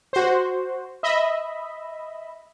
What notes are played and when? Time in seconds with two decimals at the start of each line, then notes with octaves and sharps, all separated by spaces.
0.13 F#4 C5
1.03 D#5 E5 B5